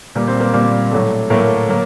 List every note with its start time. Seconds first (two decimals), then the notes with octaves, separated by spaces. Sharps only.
0.15 A#2 G3 A#3
0.28 C4 C5
0.40 A#3 A#4
0.53 A#2 G3 A#3
0.91 A2 F#3 A3
1.30 A2 F#3 A3 A#3 A#4
1.69 F#3 A#3